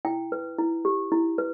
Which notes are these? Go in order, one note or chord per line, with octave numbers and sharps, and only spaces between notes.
E4 G5
B4
E4
G4
E4
B4